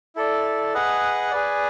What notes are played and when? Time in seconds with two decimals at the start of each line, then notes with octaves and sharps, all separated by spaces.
0.16 E4 A4 D5
0.74 G#4 B4 D#5 F#5
1.31 G#4 B4 D5